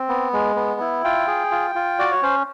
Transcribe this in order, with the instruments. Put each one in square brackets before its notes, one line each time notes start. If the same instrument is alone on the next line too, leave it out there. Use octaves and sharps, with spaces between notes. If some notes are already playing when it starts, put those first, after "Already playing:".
Already playing: [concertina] C4
B3
G#3
B3
E4
F4 G5
G#4
F4
F4
F#4 D5
C#5
C#4 C5